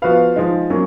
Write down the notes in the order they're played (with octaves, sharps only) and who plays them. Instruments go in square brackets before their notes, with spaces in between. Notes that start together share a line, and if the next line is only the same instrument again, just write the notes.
[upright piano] F3 B3 F#4 B4 F5
F3 G#3 D#4
F#3 A#3 C#4